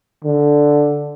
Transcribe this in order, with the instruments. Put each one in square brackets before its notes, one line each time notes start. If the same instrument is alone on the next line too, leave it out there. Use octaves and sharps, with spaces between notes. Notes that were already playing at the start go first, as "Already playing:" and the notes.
[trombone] D3